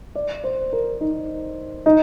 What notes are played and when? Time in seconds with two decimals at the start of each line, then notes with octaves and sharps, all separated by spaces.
0.15 D5
0.44 C5
0.73 A#4
1.01 D#4
1.86 D#4